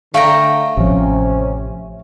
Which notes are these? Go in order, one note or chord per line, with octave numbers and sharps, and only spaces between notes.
D3 A3 F5 G5 A#5
A1 C3 F3 C#4